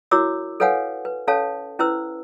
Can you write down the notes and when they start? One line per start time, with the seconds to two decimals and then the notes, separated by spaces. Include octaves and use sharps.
0.11 E4 F#4 A#4 C#5 D6 E6
0.60 A4 B4 C#5 F5 F#5 G#5
1.05 B4
1.28 C#4 A4 C#5 F5 A5
1.79 C#4 E4 B4 C5 E6